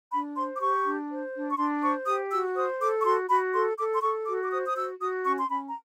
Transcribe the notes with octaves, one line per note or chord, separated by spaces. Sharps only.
D4 B5
C5 C6
D6
G4 C#6
D4
C5
D4
C#6
D4 C6
C5 C#6
G4 D#6
F#4 E6
C5 D#6
A4 D6
C#6
F#4 C6
F#4 B5
A4 C6
A4 D6
C6
A4 C#6
F#4 D6
D6
C5 D#6
D#6
F#4 E6
F#4 D#6
C#4 C#6
C6
C#4 B5
A#5